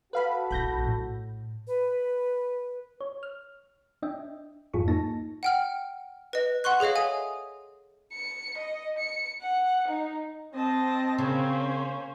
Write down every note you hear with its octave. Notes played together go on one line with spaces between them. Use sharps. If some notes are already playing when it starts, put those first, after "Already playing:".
F#4 A4 B4 F5 B5
A#1 E4 B5 G6 A#6
A2
B4
C#5
F6
D4 D#5 E5 G5
F2 G#2 F4 G#4 A4 C#6
A#3 D#4 A5 A#6
F#5 G5 F6
B4 D#5
F#5 C6 C#6 F#6
G#4 A4 C#5 D#5 F5
E5 G#5 D#6
C#7
D#5
C#7
F#5
D#4
C4 D#5 A5 A#6
C#3 A#3 C#4 C5